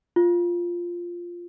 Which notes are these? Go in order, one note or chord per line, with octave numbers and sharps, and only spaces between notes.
F4